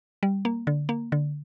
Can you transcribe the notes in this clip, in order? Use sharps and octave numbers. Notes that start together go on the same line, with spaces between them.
G3
A#3
D3
A#3
D3